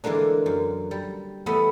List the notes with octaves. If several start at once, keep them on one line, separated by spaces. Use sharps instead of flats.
D3 E3 G#3 A#3 D4
F#2
G3
E2 A3 B3 D#5 E5